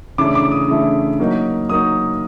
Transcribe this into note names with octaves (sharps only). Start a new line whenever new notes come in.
C#3 E3 A3 D4 D6
D6
D#6
C#3 E3 A3 D4
F#3 A#3 D#4
F#3 A#3 D#4 D#6